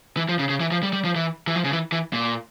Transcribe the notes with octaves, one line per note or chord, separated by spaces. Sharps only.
E3
F3
C#3
C#3
E3
F3
G3
G3
F3
E3
E3
F3
C#3
E3
E3
A#2